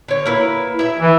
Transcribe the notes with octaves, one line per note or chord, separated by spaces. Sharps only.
D3 C#5
A#3 E4 B4
E4 E5
E3